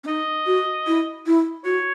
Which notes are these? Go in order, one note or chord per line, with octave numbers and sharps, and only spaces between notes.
C#4
D#4 D#5
F#4
E4
E4
F#4 C#5